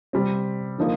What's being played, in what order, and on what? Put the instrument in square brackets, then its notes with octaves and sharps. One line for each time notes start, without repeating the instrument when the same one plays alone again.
[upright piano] C3 G3 C4
D3 F3 A#3 D#4